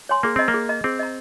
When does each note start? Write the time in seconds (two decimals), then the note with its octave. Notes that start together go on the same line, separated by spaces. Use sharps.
0.09 C#5 G#5 C6
0.23 A#3 G#4
0.36 C4 D#5 A#5
0.48 A#3
0.54 G#4
0.69 D#5 A#5
0.84 C4 G#4
0.99 D#5 A#5